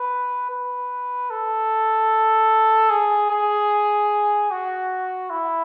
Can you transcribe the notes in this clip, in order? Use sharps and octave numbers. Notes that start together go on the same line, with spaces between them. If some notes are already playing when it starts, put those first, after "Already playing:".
Already playing: B4
B4
A4
G#4
G#4
F#4
E4